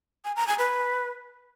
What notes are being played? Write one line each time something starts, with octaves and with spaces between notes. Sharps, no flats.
G#5
A#5
G#5
B4